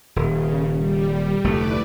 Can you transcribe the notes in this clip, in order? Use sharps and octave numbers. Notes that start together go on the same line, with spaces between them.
D#1 C#3
G3
F1 D2 A3 E4 B4 D5